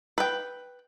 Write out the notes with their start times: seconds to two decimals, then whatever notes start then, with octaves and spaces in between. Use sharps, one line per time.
0.18 B4 G5